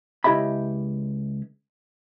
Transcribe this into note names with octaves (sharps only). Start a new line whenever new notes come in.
C#2 E4 G4 D#5 E5 B5